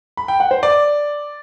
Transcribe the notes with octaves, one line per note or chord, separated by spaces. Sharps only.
B5
G5
F#5
C5
D5